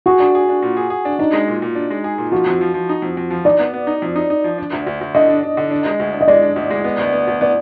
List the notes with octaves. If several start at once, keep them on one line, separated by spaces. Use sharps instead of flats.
F#4 G#4
D4
G#4
D4
A#2
G#4
G#4
D4
D4 D#4
G#3
A#2
A#2
D4
G#3
G#4
A#2
F3 F#4
F2
F3
F3
D#4
F2
F2
F3
D#4 D5
B3
B3
D#4
F2
D#4
D#4
F3
D4
D2
D2
D2
D3 D#5
D4
D4
D3
D4
G#3
D2
D4
D#5
G#3 D5
D4
D2
G#3
B3
D2
B3
D2
B3 D5